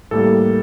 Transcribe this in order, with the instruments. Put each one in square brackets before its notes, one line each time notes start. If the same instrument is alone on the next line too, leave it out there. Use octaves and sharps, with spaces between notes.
[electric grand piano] A2 G3 A#3 A4